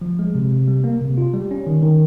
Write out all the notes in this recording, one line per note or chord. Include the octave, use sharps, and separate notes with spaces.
F3
G#3
C3
C3
G3
A#3
C3
F4
G3
C#4
D#3
D#3